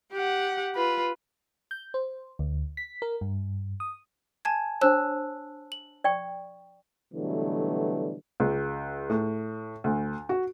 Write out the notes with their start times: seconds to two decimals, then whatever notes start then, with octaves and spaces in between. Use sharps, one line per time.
0.13 G4 F#5
0.75 F4 B4
1.71 G6
1.94 C5
2.39 D2
2.77 B6
3.02 A#4
3.21 G2
3.80 D#6
4.45 G#5 A5 G#6
4.81 D4 C5 C#5 A5 E6 F#6
5.72 F#7
6.04 D5 G5 C#6
7.14 B2 D3 E3 F#3 G3 A3
8.40 C#2
9.09 A2
9.84 D2
10.29 F#4